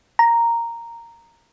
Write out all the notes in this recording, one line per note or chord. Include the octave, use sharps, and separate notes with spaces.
A#5